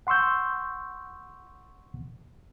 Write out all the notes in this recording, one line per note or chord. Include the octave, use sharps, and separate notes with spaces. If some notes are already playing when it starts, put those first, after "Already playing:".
F#5 C6 C#6 E6 G6